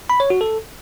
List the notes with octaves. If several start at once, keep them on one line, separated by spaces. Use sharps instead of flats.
B5
C#5
F#4
A4